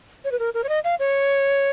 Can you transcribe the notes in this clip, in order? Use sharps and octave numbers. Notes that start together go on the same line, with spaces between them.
C#5
B4
A#4
A#4
C#5
D#5
F5
C#5